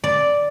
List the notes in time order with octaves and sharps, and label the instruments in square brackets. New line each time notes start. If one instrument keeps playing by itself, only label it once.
[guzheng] D5